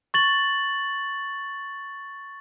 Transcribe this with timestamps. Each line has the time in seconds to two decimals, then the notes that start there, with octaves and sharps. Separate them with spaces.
0.14 C#6 A6 F#7